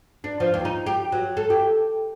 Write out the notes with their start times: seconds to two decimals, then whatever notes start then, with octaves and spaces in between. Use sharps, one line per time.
0.24 D4
0.40 F3
0.54 D#2
0.65 D#4
0.86 G4
1.12 F#3
1.37 A4
1.50 G4